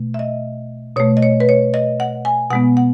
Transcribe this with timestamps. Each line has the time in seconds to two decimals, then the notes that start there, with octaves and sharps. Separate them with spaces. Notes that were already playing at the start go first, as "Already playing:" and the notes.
Already playing: B2 A3
0.14 E5
0.19 D#5
0.96 B2 A3 C#5
1.17 D#5
1.22 C#5
1.40 B4
1.49 C#5
1.74 D#5
2.00 F#5
2.25 G#5
2.51 B2 G#3 B3 F#5
2.77 F#5